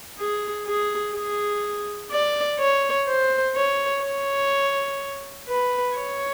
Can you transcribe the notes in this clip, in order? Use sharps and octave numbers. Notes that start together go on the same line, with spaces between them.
G#4
G#4
G#4
D5
C#5
C5
C#5
C#5
B4
C#5